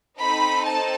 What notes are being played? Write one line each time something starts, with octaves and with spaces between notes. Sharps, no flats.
C4 D#4 A4 B5
A5